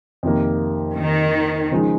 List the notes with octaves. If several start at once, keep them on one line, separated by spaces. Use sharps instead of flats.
F2 C3 D#3 A#3
D#3
C#3 F3 G#3 D#4